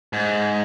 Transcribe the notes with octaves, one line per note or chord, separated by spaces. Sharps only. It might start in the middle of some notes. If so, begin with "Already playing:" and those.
G#2